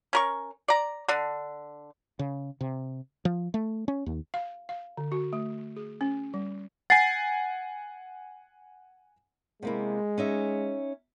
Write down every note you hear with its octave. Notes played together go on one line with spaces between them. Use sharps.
C#4 A#4 C#6
D5 A#5
D3 D4
C#3
C3
F3
A3
C#4
D#2
F5
F5
D3
F#4
A3
G#4
C#4
G3
F#5 G#5 A6 C7
C3 G#3 A#3 E4
C#4 D#4 E5